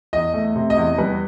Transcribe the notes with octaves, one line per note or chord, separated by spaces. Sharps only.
E2 D#5
A3
C3
D#5
E2
G3 B4